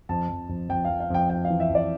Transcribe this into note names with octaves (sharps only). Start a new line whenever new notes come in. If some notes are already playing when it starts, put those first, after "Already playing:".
F2 A5
F2
F2
F2 G5
F2 F5
F5
F2 G5
F2 G5
F5
E3
E5
F2
D5